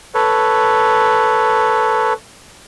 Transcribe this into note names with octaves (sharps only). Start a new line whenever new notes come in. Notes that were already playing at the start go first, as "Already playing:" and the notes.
A4 B4 C#5